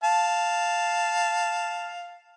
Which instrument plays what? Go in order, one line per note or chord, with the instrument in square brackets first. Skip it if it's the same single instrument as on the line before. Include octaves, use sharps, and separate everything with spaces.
[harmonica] F5 A5